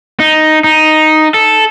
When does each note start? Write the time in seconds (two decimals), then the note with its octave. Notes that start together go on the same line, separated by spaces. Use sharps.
0.20 D#4
0.64 D#4
1.34 A4